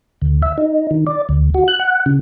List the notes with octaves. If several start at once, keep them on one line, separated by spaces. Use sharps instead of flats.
D2
E5
D#4
D#3
D5
D2
F#4
F#6
F#5
C#3